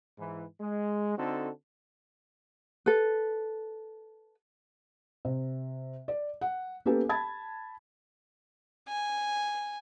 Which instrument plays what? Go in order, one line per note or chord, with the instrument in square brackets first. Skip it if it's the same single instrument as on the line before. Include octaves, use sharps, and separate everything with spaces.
[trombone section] G#2 E3
G#3
D3 C4 D#4 F#4 A4
[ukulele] A4 B4
[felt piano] C3
D5
F#5
A#3 B3 C#4 G4 A4
A5 B5 G#6 A6
[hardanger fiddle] G#5